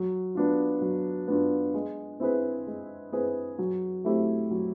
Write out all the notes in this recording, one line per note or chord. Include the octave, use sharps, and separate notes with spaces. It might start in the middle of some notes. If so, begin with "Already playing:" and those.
Already playing: F#3
B3 D4 F4
F#3
B3 D4 F4
G#3
C4 E4 G#4 B4
G#3
C4 E4 G#4 B4
F#3
A3 C4 E4 G4
F#3